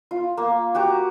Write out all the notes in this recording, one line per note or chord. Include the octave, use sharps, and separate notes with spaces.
F4
A#3
F#4 G4 A#5